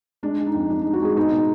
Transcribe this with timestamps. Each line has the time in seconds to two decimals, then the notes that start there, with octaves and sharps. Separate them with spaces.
0.23 G#3 D4
0.39 G#3
0.47 D#4
0.54 F2
0.70 F2 D4
0.81 G#3 D#4
0.93 F#4
1.01 G#3 G#4
1.17 B2 D#4
1.33 B2